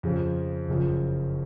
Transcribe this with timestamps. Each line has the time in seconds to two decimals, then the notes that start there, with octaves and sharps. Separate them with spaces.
0.03 F2 C#3 F3
0.68 F#1 F#2 C#3 F3